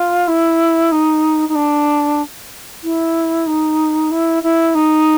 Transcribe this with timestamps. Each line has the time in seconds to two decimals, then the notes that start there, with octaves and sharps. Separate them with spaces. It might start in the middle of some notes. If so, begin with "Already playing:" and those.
Already playing: F4
0.28 E4
0.92 D#4
1.49 D#4
1.55 D4
2.83 E4
3.47 D#4
4.11 E4
4.43 E4
4.75 D#4